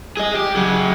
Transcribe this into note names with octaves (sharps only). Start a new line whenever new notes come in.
G#4 D#5
G4
F#3 G#4